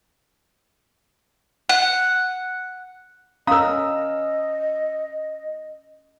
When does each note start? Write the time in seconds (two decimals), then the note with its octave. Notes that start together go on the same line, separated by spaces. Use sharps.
1.69 F#5
3.47 C#4 A#4 D#5 F5 A#5 D#6 E6